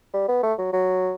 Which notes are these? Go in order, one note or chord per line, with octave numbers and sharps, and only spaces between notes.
G3
B3
A3
F#3
F#3